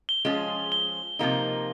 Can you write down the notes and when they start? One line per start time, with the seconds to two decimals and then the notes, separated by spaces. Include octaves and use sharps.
0.09 G7
0.25 F3 G#3 C#4 F4 G#4
0.72 G7
1.19 C3 F3 A#3 D#4